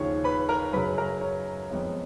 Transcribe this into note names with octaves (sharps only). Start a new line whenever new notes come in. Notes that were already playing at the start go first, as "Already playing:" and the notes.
Already playing: D#2 C#3 F3 C#5 C#6
B4 B5
A#4 A#5
F#2 C#3 F#3 B4 B5
A#4 A#5
C#5
F2 D#3 G#3 B3 D#4 C#5